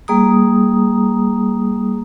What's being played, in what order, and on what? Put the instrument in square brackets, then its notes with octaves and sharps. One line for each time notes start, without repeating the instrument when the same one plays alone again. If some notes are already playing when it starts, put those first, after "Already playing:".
[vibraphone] G3 A#3 G#4 A#5 D#6